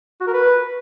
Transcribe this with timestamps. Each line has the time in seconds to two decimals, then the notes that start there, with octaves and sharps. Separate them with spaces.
0.21 F#4
0.27 A#4
0.34 B4